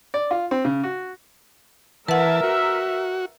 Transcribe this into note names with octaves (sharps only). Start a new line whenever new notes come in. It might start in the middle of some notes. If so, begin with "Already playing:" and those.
D5
F4
C4
C#3
F#4
E3 A#4 B4 E5 F#5 A5
F#4